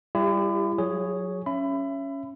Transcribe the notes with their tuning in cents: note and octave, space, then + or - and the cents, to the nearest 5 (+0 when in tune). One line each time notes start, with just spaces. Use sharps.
G3 +5 E4 +40 G4 +30
F#3 -25 G#4 +0 C#5 +5
C#4 +0 E5 +30 B5 +25